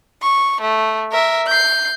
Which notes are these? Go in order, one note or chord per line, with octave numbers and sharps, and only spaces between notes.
C#6
A3
A#4 E5
G6 C7